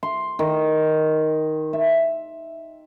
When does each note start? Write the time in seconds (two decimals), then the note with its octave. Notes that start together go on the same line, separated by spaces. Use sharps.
0.03 C6
0.39 D#3
1.73 E5